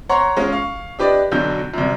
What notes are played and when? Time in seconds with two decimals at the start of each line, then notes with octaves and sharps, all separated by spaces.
0.09 C#5 F#5 A#5 C6 C#6
0.37 G#3 C#4 F4
0.52 F5 C#6
0.99 D4 G4 B4 D5 D#5
1.32 B1 B2 D3 F#3 G6
1.74 C2 F#2